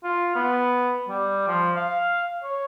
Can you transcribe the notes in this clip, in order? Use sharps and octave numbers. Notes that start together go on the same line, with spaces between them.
F4
B3
G3
F3
F5
C#5